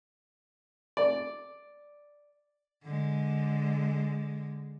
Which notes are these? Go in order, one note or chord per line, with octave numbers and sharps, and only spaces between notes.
D5
D3 G#3